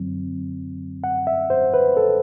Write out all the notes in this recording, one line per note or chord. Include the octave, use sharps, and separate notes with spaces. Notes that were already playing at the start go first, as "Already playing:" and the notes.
Already playing: F#2 D3 F#3 C4
F#5
E5
C5
B4
A4